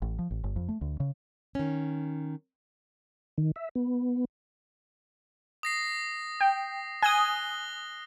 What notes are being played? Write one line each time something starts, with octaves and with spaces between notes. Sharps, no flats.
A1
F3
A1
G1
F2
A3
D2
C#3
D#3 C#4
D#3
E5
B3
D#6 A#6 C7
G5
G#5 D#6 F#6 A#6 G7